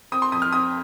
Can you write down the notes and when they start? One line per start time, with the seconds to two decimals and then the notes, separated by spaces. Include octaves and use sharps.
0.12 C4 D#6
0.22 C6
0.32 F2 D#6
0.42 F6
0.52 C4 D#6